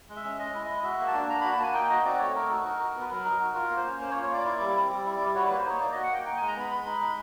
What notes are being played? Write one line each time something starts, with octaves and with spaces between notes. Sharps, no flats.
G#3
E5
C#4
G#3 D#5
E4
G#3
F#4 E5
A#3
A5
D4
A#3 A#5
F#4 B5
A5
A#3 G#5
D#4 G5
F#4 D#5
C4 D5
A3 C#5
D#4 A#4
F#4 A4
D#4 A#4
F#4
B3
B4
F#3 A#4
D#4
F#4
F4 A#4
A#3
C5
C#4
A#3 C5
C#5
F4
C#5
A#3 D5
E4
G3
C4
G3
E4
G3
F#4 C#5
A#3 B4
C5
D#4 C#5
A#3 D5
F#4 D#5
F#5
A#3 G5
D#4 G5
G#3 G#5
A#5
B3 B5
G#3 B5
D#4
G#3